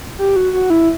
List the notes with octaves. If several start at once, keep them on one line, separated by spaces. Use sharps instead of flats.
G4
F#4
F#4
E4